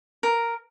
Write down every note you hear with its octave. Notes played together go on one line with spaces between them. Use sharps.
A#4